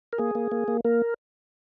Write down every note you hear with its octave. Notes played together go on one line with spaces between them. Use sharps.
A#4
A#3 G#4
A#3
A#3
A#3
A#3 A#4